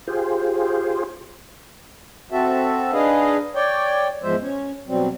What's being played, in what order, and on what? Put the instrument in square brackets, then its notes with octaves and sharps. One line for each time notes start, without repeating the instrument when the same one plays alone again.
[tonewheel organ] F4 G4 G#4 C5
[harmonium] C4 F#4 A4 E5
D4 D#4 G#4 B4 D#5 F5
C#5 D5 G5
E2 G#2 F3 G#3 C5 E5
C#4
B2 F#3 G3 C4